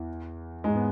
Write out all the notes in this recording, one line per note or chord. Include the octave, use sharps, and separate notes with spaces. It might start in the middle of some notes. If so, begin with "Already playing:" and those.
Already playing: E2 E3
G#2 G#3
B3